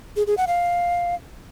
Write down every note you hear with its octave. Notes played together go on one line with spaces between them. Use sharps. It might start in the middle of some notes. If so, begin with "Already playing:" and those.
G#4
G#4
F#5
F5